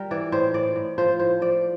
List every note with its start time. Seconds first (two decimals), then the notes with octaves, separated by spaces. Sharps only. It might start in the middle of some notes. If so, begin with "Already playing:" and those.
Already playing: G3 A#4
0.11 E3 D5
0.32 A2 C5
0.54 A2 D5
0.76 A2
0.98 F3 C5
1.19 A2 C5
1.42 F3 D5